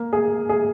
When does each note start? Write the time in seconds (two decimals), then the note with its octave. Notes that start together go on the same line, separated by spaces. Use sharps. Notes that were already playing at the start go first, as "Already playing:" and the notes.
Already playing: A#3
0.13 G#4
0.49 G#4